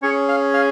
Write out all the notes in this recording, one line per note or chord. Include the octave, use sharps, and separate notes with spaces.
C#4 G#4 C#5
F5
F5